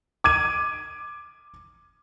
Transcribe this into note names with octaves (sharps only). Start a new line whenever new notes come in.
D6 G#6 D#7